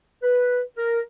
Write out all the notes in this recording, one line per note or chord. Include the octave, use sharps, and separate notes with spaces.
B4
A#4